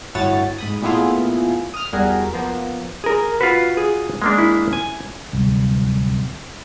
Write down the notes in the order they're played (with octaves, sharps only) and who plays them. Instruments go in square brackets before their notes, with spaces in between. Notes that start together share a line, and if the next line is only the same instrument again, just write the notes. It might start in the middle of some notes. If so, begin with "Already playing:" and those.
[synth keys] G1 A2 A3 F#4 C#5 A6
G#2 B5 D#6
A#2 A3 B3 E4 F4 G#4
D#6 F6
E2 G3 F#4 G#4 A#4
F3 A#3 B3
[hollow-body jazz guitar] G#4 A#4
[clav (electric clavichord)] F4 F#4 [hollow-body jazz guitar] B4
[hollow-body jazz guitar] G#4
[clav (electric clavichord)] G#3 A#3 D4
[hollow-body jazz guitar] E4
[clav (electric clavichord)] G#5
[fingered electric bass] D1 C2